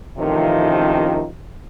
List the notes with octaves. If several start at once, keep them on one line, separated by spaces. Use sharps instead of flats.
A1 C3 D#3 F3